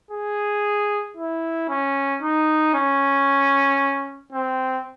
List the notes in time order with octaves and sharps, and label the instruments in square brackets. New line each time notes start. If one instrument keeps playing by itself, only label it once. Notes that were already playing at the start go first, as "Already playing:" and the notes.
[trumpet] G#4
E4
C#4
D#4
C#4
C4